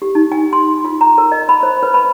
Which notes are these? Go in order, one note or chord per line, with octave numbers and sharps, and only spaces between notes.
G4
D#4
G#5
C6
F4
A#5
A#4
D#5
B5
C5
B4
B5